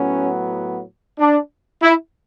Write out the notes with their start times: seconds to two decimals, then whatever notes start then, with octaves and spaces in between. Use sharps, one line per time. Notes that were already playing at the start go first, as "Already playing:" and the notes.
Already playing: A2 F#3 B3 C#4
1.19 D4
1.82 E4